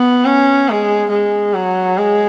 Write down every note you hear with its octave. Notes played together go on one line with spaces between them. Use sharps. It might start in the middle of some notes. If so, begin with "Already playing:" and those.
Already playing: B3
C#4
G#3
G#3
F#3
G#3